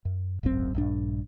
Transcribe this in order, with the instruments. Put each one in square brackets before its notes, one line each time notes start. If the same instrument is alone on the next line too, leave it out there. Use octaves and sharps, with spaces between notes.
[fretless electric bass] F#2
D1 G#1 F#2 C4
A#1 G2 D4